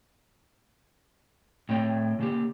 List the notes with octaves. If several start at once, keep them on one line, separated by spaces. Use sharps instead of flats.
A2 C4 C#5 G5
C#3 A#3 G4